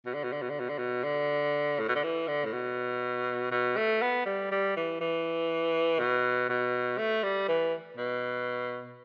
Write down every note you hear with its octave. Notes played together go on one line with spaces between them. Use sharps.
B2
D3
B2
D3
B2
D3
B2
D3
B2
D3
A2
B2
D3
E3
D3
A2
B2
B2
A3
B3
G3
G3
E3
E3
B2
B2
A3
G3
E3
B2